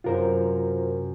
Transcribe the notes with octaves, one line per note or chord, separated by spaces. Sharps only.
F#2 C3 F4 A#4 C5